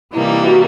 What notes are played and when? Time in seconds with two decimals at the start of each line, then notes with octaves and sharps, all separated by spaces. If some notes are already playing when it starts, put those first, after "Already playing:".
0.13 C3 E3 G3 A#3 D#4 E4
0.29 E4
0.45 F#4